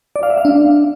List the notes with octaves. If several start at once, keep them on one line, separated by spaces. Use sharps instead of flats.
D5
F5
E5
F5
D4